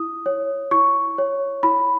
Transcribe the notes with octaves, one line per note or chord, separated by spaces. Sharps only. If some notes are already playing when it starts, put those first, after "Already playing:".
Already playing: E4 D#6
C#5
E4 C#6
C#5
E4 B5